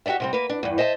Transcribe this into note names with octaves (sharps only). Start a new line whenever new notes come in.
F#4 G4 A4 D5 E5
C3 G3 C4
A#3 B4
D4
E2 G2
C5 D#5 E5 G5 A5